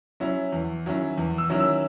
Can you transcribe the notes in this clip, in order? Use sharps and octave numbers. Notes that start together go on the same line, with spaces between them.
F#3 C#4 E4
E2
D#3 F#3 C#4 E4
E2
E6
D#3 F#3 C#4 E4
E6